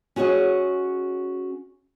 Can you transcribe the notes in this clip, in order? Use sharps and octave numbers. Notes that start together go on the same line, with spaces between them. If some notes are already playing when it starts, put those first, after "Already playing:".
C#4 F#4 G#4 C#5 D#5